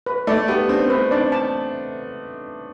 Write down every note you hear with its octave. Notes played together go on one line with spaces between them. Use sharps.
B4
A3 D5
B3 G4
C4 D4
C4 B4
D4 D5
A5